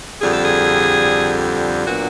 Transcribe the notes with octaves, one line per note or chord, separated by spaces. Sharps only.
F2 D3 G3 G#4
A4
G#4
A#2 F#3 B3 D4 F#4